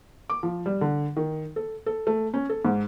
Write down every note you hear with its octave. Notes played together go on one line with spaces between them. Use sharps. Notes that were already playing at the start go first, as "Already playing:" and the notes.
D6
F3
G3
D3
D#3
A4
A4
A3
C#4
A4
G#2